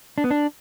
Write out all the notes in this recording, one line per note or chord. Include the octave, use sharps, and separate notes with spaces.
D4
B3
D4